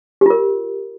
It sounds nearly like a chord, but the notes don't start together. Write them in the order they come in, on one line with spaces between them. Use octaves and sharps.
G4 F4 A#4